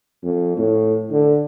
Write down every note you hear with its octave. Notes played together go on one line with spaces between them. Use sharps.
F2
A2
D3